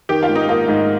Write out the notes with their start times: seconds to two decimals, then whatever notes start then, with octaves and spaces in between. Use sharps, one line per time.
0.09 D#3 G4
0.23 F4
0.29 G#2
0.35 D#4
0.49 A#3 F4
0.68 G#2